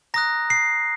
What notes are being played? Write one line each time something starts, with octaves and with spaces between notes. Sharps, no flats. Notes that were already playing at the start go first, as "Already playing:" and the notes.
A#5 D#6 F#6 A#6
C7